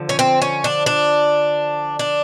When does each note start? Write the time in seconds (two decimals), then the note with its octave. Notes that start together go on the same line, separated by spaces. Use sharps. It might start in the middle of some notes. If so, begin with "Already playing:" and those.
Already playing: D3 F3
0.09 C#4
0.19 C4
0.42 C#4
0.64 D4
0.86 D4
1.99 D4